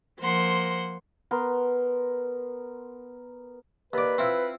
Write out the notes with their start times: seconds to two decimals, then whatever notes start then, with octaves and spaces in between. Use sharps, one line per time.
0.19 F3 A#3 C5 F#5 C6
1.31 B3 A#4 C6
3.93 D#2 B4 D5
4.18 C4 E4 F4